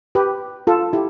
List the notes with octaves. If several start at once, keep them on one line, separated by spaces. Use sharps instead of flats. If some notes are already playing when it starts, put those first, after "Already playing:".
G4 B4
F4 A4
E4 G4